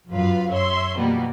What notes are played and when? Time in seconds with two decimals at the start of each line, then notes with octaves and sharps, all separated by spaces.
0.10 F#2 F4 B4 F5
0.50 C#5 E5 C6
0.96 B2 E3 F3 G3 A#3 B3